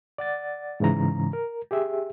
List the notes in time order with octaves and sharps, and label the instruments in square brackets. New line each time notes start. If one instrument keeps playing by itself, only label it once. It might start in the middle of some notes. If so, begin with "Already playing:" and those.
[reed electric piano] D5 F#5 A6
G#2 C#3 E3 A#5
A#4
G4 G#4 E5